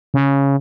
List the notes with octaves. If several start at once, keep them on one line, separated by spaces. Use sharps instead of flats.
C#3